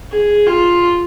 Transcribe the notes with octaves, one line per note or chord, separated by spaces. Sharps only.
G#4
F4